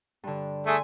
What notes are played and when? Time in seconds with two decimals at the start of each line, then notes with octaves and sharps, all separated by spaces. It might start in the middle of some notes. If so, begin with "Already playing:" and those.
0.23 G2 D3
0.66 A3 G#4 E5 G#5 C6